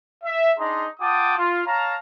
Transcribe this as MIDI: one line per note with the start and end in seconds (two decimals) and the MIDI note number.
0.24 0.52 76
0.58 0.86 62
0.58 0.86 63
0.58 0.86 68
0.58 0.86 75
0.58 0.86 82
0.58 0.86 84
1.00 1.35 65
1.00 1.35 78
1.00 1.35 79
1.00 1.35 81
1.00 1.35 86
1.00 1.35 87
1.37 1.62 65
1.66 1.95 73
1.66 1.95 77
1.66 1.95 81
1.66 1.95 82